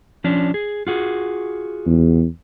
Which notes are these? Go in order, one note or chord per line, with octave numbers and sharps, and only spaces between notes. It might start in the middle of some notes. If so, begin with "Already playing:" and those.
F3 C#4 D4
G#4
F4 F#4 G#4
E2